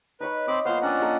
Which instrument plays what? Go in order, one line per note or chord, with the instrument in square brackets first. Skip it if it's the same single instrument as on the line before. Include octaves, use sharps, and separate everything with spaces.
[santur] D#4 C#5 B5 [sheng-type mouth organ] B4
[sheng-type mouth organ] C4 B5 D6 [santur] D#5
[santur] F3 A#3 B3 [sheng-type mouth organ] C5 F5
[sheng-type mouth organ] C#4 D4 F#5 [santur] D#5 G5 A#5
[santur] A#3 A4 A#4